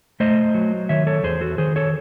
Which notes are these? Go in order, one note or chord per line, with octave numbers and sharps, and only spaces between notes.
A3 C5 D#5
F#3
D#3 C#5 E5
A4 C#5
E2 G#4 C5
F#4 A4
D#3 G#4 C5
A4 C#5